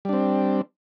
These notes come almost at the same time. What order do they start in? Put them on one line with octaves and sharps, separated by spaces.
G3 D4 C4